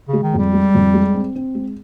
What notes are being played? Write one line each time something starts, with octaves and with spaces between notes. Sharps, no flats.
C#3
G#3
D#3
F2 G3
G#3
F2
G#3
C4
C4
G#3